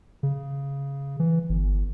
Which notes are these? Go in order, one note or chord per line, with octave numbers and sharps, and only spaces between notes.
C#3
E3
G1